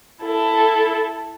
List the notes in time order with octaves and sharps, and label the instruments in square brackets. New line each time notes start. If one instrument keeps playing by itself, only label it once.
[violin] E4 A4